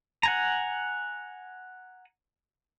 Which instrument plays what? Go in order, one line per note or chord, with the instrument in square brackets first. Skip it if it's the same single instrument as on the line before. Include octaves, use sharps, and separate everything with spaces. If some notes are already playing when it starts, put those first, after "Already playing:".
[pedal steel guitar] F#5 G#5 A#5